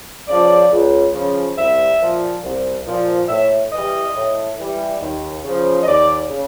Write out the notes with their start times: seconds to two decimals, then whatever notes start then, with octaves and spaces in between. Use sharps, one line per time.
0.28 C#3 F3 D5
0.71 C#2
1.14 C#3 F3
1.57 C2 E5
2.01 A#2 F3
2.44 C2
2.86 A#2 F3
3.29 A2 E5
3.72 E3 G3 D#5
4.16 A2
4.59 E3 G3
5.01 D#2
5.44 C#3 F3
5.83 D#5
5.87 D#2 D5
6.30 C#3